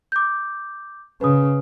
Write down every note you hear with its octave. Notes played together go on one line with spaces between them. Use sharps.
D6 G6
C#3 B4 D#6